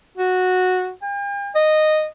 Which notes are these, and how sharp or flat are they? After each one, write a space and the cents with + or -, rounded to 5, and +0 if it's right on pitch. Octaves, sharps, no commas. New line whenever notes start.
F#4 -10
G5 +45
D#5 -10